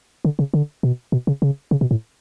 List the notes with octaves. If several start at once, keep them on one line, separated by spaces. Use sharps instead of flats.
D3
C#3
D3
B2
B2
C#3
C#3
C#3
B2
A2